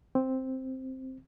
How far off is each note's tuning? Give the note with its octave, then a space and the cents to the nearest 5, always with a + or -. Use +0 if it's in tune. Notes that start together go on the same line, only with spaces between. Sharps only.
C4 +0